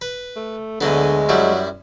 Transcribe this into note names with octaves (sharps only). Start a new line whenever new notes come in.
B4
A3
D2 D3 F#3 G#3 B3
F#2 F#3 G3 E4